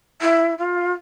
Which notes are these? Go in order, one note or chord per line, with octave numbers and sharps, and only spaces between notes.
E4
F4